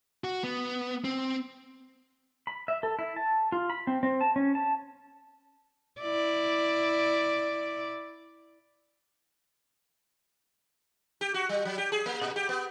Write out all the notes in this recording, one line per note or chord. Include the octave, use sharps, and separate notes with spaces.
F#4
B3
C4
B5
E5
A4
E4
A5
F4
B5
C4
C4
A5
C#4
A5
E4 D5
G4
F#4
G3
F#3
G4
G#4
A#3
A#2
G4
B3